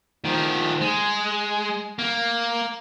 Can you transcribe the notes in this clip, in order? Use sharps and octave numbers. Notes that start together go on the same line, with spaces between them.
D#3 F3
G#3
A#3